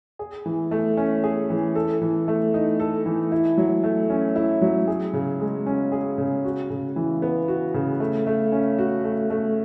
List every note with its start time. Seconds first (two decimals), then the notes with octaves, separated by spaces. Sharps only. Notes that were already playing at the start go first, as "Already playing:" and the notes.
0.19 G#4
0.46 E3
0.71 A3
0.97 C#4
1.24 G#4
1.50 E3
1.75 A4
2.02 E3
2.28 A3
2.54 D#4
2.80 A4
3.06 E3
3.32 E4
3.58 F#3
3.84 A3
4.10 C#4
4.36 E4
4.62 F#3
4.87 G#4
5.13 C#3
5.40 G#3
5.67 C#4
5.92 G#4
6.18 C#3
6.45 F#4
6.70 C#3
6.96 E3
7.22 B3
7.48 F#4
7.74 C#3
8.00 A3
8.27 A3
8.52 C#4
8.78 F#4
9.04 A3
9.30 A3